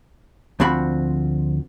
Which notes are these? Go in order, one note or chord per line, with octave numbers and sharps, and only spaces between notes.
D2 F3 C4 F#4 B5